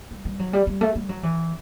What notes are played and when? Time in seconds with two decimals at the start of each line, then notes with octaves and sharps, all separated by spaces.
0.11 G3
0.25 G3
0.39 F#3
0.53 G3
0.67 G3
0.81 A3
0.95 G3
1.09 F#3
1.23 E3